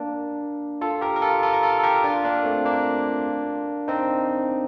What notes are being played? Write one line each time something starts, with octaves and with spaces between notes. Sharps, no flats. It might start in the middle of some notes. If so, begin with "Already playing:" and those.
Already playing: A#3 D4
F4 A4
G4 A#4
A#4
F4 A4
F4 A4
A#4
F4 A4
A4
G4 A#4
D4 F4
A#3 D4
A3 C4
A#3 D4
C4 D#4